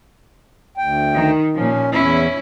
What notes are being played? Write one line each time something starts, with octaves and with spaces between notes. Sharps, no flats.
D2 G5
D#3
A#2 F3 C#4
E2 C#4 E4